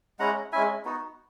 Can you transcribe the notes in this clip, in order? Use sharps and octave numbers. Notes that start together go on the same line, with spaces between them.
G#3 C#4 E4 F#5 A#5
G#3 C#4 E4 E5 G#5
B3 D#4 F#4